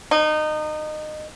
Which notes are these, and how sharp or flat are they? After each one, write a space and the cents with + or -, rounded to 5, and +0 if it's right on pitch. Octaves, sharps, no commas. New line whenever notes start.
D#4 -25